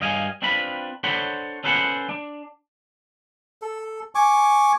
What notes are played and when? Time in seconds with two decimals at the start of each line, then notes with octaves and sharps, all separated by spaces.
0.01 G2 D#5 F5 G#5
0.42 C4 D4 F4 B4 B5
1.04 D4 A4 C5 C#5 F#5 B5
1.64 C#4 A4 B4 C5 F#5
2.09 D4
3.62 A4
4.15 G#5 C#6 D6